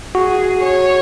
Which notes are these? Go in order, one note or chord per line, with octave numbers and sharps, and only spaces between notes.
F#4 G#4
C#5